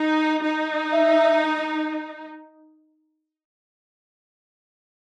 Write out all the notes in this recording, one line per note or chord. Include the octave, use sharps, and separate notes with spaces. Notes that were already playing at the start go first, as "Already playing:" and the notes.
Already playing: D#4
D#4
E5